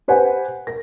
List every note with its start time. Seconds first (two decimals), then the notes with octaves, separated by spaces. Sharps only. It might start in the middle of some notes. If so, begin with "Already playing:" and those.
0.08 G4 B4 C5 F#5 G#5
0.67 A#4 A#6